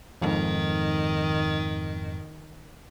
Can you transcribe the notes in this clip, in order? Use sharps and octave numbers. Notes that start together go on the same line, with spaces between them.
F2 G#2 D#3